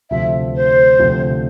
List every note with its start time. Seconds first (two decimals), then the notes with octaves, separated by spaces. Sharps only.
0.10 D2 C3 F3 E5
0.55 C5
0.99 D2 C3 F3